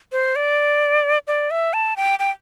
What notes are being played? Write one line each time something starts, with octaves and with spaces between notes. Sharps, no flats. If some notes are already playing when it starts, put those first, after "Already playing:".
C5
D5
D5
E5
A5
G5
G5